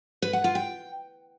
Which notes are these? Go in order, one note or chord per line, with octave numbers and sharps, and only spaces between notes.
B4
F#5
F4
G5